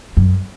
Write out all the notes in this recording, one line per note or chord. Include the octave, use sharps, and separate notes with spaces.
F#2